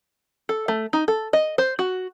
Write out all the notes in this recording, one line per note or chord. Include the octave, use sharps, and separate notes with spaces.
A4
A3
D#4
A4
D#5
C5
F#4